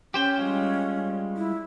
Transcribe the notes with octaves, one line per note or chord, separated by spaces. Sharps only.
C#4 G4 C5 G5
G3 G#3 F4
E4